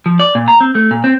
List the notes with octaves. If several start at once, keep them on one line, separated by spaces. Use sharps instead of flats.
F3
D5
A#2
A#5
C4
A3
A#2
C4